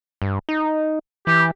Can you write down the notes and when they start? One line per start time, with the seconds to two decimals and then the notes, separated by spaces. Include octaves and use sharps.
0.22 G2
0.49 D#4
1.27 E3 G4